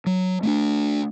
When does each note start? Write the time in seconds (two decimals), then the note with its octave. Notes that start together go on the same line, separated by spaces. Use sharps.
0.06 F#3
0.43 A3 A#3 D4